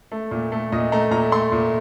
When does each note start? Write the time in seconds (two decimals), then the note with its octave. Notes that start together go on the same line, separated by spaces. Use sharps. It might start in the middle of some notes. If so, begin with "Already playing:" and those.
0.12 A3
0.31 A#2
0.52 A3
0.72 A#2 D#5
0.92 A3 A#5
1.11 A#2 A#5
1.32 A3 C6
1.52 A#2